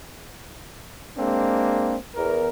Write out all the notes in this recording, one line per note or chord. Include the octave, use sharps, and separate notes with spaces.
G#3 A#3 C4 D4
E2 A#4